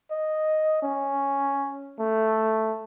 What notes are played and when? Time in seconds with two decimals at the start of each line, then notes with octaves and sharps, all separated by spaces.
0.11 D#5
0.82 C#4
1.99 A3